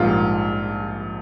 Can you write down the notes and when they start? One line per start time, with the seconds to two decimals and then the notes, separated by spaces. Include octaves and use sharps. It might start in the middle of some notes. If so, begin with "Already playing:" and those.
Already playing: A#1 G#2 G3 A#3 F4